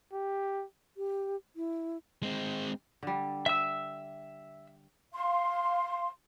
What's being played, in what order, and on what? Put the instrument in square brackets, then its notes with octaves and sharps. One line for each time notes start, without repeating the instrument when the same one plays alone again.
[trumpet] G4
[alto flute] G4
E4
[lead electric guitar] G#3 C4
[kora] D3 G3
[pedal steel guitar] E5 E6
[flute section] F5 C6